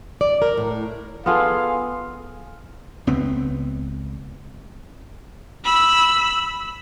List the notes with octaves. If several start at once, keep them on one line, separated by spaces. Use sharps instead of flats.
D5
A#4
A2
B3 F4 G#4 A4 F5
C#2 B3 C4
B5 E6